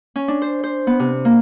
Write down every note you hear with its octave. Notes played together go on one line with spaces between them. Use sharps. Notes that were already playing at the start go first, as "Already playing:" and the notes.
C#4
D4
C5
C5
B3
C3
A#3